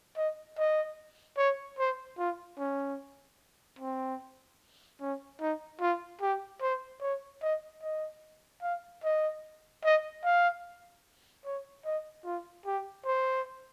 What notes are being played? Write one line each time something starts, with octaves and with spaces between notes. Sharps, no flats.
D#5
D#5
C#5
C5
F4
C#4
C4
C#4
D#4
F4
G4
C5
C#5
D#5
D#5
F5
D#5
D#5
F5
C#5
D#5
F4
G4
C5